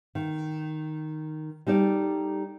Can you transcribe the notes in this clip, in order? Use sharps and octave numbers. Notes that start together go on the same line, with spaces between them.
D#3
G3 D#4 A4 D5